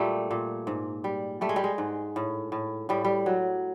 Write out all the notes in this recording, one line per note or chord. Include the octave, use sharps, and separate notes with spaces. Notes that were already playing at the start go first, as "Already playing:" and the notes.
Already playing: A#2 G3 A3
A#2
G#2
G3
G3 A3
G#3
G3
G#3
G#2
A2
A2
A2 G3
G3
F#3